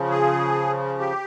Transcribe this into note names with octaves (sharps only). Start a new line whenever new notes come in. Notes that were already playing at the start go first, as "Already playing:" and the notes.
Already playing: C#3 F3
G#4
G4